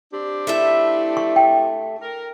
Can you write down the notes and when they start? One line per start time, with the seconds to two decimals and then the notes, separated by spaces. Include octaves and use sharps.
0.12 C4 D4 G4
0.47 A3 E4 E5
1.17 C#6
1.36 G5
2.02 A#4